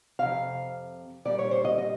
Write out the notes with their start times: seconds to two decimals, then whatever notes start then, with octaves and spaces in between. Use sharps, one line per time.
0.19 F2 C3 F5
1.25 A#2 G3 D5
1.38 C#5
1.51 C5
1.65 D#5
1.78 D#5